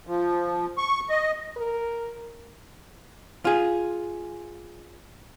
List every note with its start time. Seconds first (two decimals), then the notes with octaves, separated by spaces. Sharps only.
0.07 F3
0.78 C#6
1.10 D#5
1.57 A#4
3.45 F4 G#4